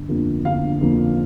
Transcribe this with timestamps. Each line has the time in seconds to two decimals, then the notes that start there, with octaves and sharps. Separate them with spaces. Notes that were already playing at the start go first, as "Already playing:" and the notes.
Already playing: G1
0.09 F2 D3 F3 A#3
0.45 G1 F5
0.81 F2 D3 F3 A#3